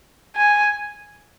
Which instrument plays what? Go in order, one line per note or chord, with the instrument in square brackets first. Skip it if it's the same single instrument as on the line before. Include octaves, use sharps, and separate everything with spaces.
[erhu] G#5